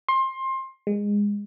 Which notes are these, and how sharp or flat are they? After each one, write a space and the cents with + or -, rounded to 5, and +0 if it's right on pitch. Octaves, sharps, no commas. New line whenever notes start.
C6 +20
G#3 -20